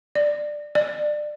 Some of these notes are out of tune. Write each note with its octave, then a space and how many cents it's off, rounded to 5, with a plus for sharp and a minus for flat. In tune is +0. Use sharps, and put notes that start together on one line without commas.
D5 +10
D5 +25